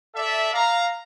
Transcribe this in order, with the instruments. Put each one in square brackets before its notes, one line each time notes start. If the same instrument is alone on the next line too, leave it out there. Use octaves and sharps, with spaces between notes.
[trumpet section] A4 D5 E5
F5 A#5